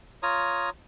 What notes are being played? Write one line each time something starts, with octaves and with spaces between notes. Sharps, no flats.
F4 C#5 A#5 D#6